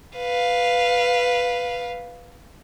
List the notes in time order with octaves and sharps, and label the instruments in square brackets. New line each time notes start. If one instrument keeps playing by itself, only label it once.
[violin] B4 F5